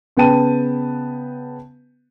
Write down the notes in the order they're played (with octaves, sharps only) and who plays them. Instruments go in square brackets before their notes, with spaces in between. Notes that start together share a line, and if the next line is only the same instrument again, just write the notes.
[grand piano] C#3 B3 B4 G5 A5 D#7